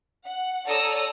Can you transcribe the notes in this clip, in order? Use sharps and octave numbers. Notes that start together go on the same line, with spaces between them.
F#5
A4 C#5 D5 A#5 D#6 E6